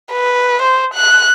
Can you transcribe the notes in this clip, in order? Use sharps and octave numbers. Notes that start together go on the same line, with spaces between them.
B4
C5
F#6